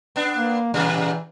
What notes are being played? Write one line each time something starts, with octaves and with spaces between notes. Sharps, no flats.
B3 D4
A#3
A#2 C#3 E3 G3